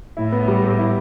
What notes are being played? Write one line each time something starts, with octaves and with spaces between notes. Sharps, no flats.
A2 E4
B3
G3
G4
E4